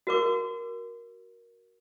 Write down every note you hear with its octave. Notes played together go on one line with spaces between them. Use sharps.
F#4 A#4 D6